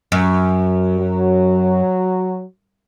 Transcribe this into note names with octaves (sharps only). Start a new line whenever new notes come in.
F#2
F#3